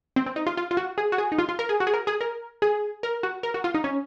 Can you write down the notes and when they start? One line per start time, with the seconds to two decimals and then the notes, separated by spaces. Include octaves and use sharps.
0.16 C4
0.26 C4
0.36 D#4
0.47 F4
0.57 F4
0.71 F4
0.77 F#4
0.98 G#4
1.12 F#4
1.18 G#4
1.32 D#4
1.39 F4
1.49 F4
1.59 A#4
1.69 G#4
1.80 F#4
1.87 G#4
1.94 A#4
2.07 G#4
2.21 A#4
2.62 G#4
3.03 A#4
3.23 F#4
3.43 A#4
3.54 F#4
3.64 F4
3.74 D#4
3.84 C#4